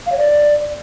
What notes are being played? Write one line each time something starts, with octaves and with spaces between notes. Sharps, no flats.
F5
C#5
D5